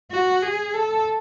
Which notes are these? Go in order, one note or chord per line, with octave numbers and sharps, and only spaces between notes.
F#4
G#4
A4